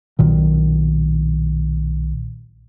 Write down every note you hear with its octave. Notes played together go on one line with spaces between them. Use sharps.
B1 A#2 D#3